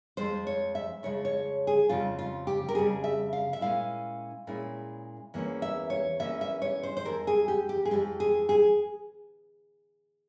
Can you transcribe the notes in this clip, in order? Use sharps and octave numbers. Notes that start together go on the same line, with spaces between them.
F2 C#3 F3 G#3 C5
C#5
E5
F2 C#3 F3 G#3 C#5
C#5
G#4
F2 C#3 G3 C4 F4
F4
G4
A#4
F2 C#3 G3 C4 G#4
E5
F5
E5
A#2 G#3 C#4 E4 F5
A#2 G#3 C#4 E4
E2 E3 A#3 C#4
E5
C#5
E2 E3 A#3 C#4 E5
E5
C#5
C5
C5
F2 E3 G#3 A#4
G#4
G4
G4
G#4
F2 E3 G#3 G4
G#4
G#4